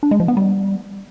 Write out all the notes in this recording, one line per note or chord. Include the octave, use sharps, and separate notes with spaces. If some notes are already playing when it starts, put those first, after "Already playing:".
D4
G#3
F3
B3
G3